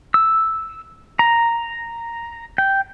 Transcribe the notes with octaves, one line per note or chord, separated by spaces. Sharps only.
E6
A#5
G5